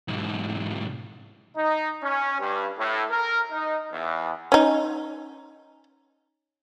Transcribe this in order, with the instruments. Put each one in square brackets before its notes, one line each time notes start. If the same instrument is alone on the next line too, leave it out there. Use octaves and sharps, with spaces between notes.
[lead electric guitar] B1 G#2
[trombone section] D#4
C#4
G2
A2
A#4
D#4
E2
[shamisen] C#4 D#4